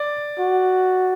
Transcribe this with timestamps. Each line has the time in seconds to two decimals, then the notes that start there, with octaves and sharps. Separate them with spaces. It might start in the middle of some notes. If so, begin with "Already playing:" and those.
Already playing: D5
0.39 F#4